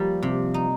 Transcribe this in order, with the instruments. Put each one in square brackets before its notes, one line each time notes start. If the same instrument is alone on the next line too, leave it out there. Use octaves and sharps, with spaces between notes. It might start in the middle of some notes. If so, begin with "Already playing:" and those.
Already playing: [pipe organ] F3 [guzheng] G3 A#3
[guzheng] C3
D#4